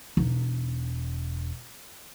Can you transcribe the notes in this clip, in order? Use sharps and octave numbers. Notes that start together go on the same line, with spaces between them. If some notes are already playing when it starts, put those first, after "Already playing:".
E1 D#4